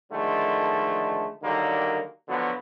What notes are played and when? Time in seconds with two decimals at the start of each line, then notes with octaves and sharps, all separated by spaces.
0.11 D3 D#3 F3 G#3 A3
1.42 D3 D#3 F#3 G3 A#3
2.28 D3 F3 F#3 B3 F#4